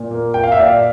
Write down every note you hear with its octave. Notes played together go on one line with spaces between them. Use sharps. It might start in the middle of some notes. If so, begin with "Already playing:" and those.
Already playing: A#2
A#3
A#3 G5
F5
E5
A#2 D5 F5